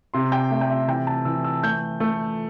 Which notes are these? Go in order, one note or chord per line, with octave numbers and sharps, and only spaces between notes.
C3 C6
G5
A3 E5
G5
E5
E3 G5
A5
E3 E6
E6
A3 G6
A3